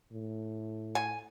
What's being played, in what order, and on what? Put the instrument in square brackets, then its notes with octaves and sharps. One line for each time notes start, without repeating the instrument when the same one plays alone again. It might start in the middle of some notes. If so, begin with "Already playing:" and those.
[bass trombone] A2
[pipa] G#5